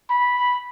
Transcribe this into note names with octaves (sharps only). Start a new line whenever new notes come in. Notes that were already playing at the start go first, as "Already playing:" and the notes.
B5